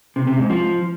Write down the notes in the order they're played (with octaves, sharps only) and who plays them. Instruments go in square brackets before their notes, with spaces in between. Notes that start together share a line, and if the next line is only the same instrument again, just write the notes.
[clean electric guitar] C3
C3
G#2
F3